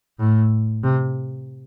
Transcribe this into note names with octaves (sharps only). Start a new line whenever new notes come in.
A2
C3